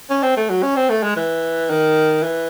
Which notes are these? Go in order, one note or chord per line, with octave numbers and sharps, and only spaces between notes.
C#4
C4
A3
F#3
C#4
C4
A3
G#3
E3
D#3
E3